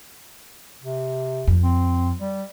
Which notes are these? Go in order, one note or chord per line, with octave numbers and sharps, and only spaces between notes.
C3
F2
C4
G3